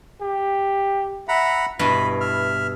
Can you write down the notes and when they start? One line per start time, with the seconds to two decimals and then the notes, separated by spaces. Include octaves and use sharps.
0.21 G4
1.29 E5 F#5 A#5 B5
1.79 G2 B2 E4 B5
2.20 E5 F6